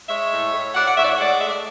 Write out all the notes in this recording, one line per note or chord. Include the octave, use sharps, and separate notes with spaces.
G#3 C#5 E5
A2
A2
A2 D5 F#5
F#5
A2 C#5 E5
D5
E5
G#3 D5 F#5
A3 E5
D5